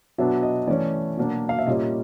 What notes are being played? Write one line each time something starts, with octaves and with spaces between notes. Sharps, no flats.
B2 F#3 B3 D4 E5
D#5
E3 A3 C#4 D5
B2 F#3 A#3 D4
F5
E5
A#2 G3 A#3 C#4 D#5